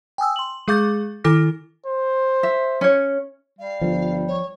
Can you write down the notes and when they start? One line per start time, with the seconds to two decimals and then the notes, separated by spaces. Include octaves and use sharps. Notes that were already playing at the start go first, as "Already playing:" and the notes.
0.18 G5 G#5 D#6 E6
0.36 C6 F#7
0.68 G#3 G#4 F5 D6 G6 A6
1.24 D#3 E4 A4 D6 F6 A#6
1.86 C5
2.43 E5
2.81 C#4 C#5
3.59 G3 F5
3.81 G1 F3
4.27 C#5